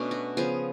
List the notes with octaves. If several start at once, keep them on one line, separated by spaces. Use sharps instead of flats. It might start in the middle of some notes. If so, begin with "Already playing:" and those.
Already playing: B2 A3 C#4 D4
F#4
C#3 F3 B3 G#4